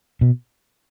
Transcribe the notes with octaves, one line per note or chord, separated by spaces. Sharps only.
B2